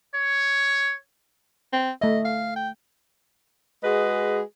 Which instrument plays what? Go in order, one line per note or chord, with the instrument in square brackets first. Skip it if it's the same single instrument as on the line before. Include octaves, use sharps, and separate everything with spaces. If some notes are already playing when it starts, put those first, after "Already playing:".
[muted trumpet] C#5
[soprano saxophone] C4
[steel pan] A3 E5 [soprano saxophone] D#5
[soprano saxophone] F5
G5
[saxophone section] G#3 F#4 G#4 B4 D#5